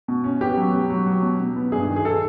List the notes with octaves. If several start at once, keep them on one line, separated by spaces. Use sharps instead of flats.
B2
C#4
B3 G4
F#3
B2
F#3
F#3
B2
B2
B3
G2 G#4
D#3
G#4
A4